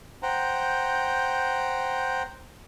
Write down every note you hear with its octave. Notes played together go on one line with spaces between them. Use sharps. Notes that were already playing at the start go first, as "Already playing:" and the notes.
C5 F#5 G5 A#5